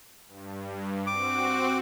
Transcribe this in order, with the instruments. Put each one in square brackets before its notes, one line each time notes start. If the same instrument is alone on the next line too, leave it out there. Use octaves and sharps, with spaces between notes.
[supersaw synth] G2
[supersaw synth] C4 F#4 [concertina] D6